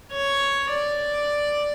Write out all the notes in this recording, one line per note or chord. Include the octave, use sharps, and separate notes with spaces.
C#5
D5